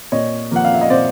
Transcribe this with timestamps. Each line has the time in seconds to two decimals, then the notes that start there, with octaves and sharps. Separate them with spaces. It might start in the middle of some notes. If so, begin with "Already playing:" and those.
0.12 A#2 C#5 D#5
0.51 F3 A#3 F#5
0.65 F5
0.74 E5
0.81 D#5
0.90 A#2 C5 D5